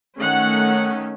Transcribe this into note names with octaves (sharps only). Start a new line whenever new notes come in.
D#3 A3 C#4 F#5